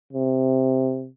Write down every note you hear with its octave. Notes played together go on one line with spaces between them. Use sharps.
C3